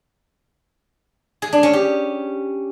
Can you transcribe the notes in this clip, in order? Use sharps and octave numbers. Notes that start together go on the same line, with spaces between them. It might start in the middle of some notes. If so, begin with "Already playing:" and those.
G#4
D4
C#4
G4